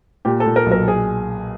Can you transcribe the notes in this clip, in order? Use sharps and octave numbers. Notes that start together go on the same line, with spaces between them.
A#2 G4
A4
A#2
A#4
B1
A#4
G#4